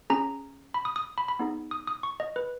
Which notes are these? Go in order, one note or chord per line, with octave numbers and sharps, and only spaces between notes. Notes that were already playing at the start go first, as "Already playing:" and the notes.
C#4 G#4 A#5
B5
D#6
D#6
B5
B5
B3 D#4 G#4
D#6
D#6
C#6
D#5
B4